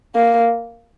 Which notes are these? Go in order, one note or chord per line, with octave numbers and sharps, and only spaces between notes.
A#3